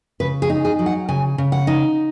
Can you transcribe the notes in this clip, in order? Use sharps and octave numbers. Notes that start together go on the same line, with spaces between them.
C#3 B4
G#4
D#4
G#4
F#3
F#5
C#3 G#5
C#3
F#5
D#4